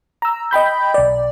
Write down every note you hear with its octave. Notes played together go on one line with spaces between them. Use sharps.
A#5 E6
D#5 G5 B5 G6
B1 D5